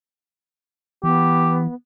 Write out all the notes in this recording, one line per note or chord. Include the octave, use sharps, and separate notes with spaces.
E3 B3 G4